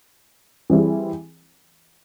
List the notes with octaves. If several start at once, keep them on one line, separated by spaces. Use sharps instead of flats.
E3 G3 C4 E4 G#4